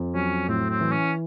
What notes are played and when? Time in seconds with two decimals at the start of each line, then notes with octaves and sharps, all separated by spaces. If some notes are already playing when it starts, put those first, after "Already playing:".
Already playing: F2
0.15 F#3 C#4
0.48 A2 C4
0.70 C4
0.81 E3
0.92 C#4